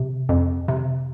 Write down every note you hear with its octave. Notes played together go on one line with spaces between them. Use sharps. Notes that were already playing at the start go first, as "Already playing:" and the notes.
Already playing: C3
F2
C3